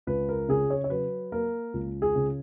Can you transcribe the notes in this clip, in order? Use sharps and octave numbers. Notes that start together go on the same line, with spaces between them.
C#2 B4
A#4
C#3 G#4
C#5
C#5
F#3 B4
A#3 A#4
C#2
G#4
C#3